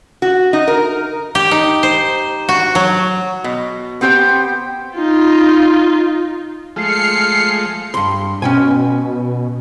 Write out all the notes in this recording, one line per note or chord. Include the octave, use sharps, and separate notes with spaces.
F#4
D#4
A#4
G4
D#4
C5
F#4
F#3
B2
B3 C4 G4 C5 G5
D#4 F4
F3 G#3 A3 F6 C7 C#7
G2 C6
B2 C#4 G5 G#5